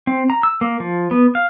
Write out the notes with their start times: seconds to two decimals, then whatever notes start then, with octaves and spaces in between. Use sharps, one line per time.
0.07 C4
0.30 A#5
0.43 E6
0.61 A#3
0.80 F3
1.11 B3
1.35 F5